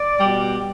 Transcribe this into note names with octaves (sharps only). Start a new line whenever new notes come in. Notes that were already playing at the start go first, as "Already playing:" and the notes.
Already playing: D5
B2 G3